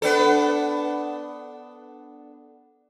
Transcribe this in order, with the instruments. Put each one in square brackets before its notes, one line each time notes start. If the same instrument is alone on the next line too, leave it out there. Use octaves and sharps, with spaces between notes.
[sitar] B3 D4 A4